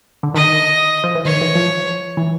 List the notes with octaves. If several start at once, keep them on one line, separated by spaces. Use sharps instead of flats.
D3
D#3 D#5
F3
E3
D#3 C#5
E3
F3
E3